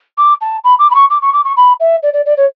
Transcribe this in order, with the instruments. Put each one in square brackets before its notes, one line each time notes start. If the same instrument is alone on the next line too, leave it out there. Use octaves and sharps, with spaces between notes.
[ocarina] D6
A5
B5
D6
B5
C#6
D6
C#6
D6
C#6
B5
E5
D5
D5
D5
C#5